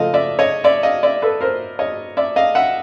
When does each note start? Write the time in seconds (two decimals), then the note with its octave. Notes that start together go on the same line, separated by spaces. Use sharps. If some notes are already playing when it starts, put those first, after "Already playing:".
Already playing: C#3 F3 A3 D#5 F5
0.14 D5 E5
0.39 C#5 D#5
0.64 D5 E5
0.83 D#5 F5
1.03 D5 E5
1.22 A4 B4
1.41 A#4 C5
1.79 C#5 D#5
2.17 D5 E5
2.36 D#5 F5
2.55 E5 F#5